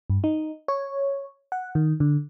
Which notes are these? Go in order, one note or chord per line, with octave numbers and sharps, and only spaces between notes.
G2
D#4
C#5
F#5
D#3
D3